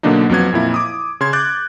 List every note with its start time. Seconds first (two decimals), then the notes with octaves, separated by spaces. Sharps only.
0.03 B2 D3 F#3 A#3 D4 D#4
0.29 F2 F#3 B3 G#6
0.52 F2 A#2 E4
0.74 D6 D#6
1.21 C#3 C6 G#6
1.33 D6 F#6 G6 A6